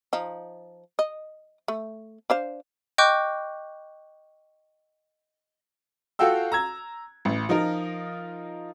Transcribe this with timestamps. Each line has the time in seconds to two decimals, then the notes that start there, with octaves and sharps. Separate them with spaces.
0.13 F3 D#4
0.99 D#5
1.68 A3
2.30 D4 C5 F5
2.98 D#5 G5 C#6 D6 F#6 G6
6.19 F4 F#4 A4 F5 G5 E6
6.52 A#5 E6 G#6
7.25 A1
7.49 F3 D#4 F4 A#4